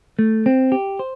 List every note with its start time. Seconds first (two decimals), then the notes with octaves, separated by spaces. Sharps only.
0.19 A3
0.46 C4
0.72 G4
0.99 C5